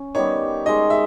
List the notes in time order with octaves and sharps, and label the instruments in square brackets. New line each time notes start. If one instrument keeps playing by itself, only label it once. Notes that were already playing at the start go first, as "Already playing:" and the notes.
Already playing: [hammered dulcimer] C#4
[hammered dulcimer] D#3 G3 B3 G4 [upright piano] C#5
[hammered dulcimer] G#3 D#4 A#4 [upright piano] D#5
[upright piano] E5